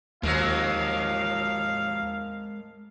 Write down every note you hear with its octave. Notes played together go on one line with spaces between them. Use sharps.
D#2 D#3 F3 F#3 G#3 A#4 C5 F5